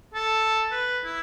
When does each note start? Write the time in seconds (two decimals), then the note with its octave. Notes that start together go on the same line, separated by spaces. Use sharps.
0.14 A4
0.71 B4
1.04 E4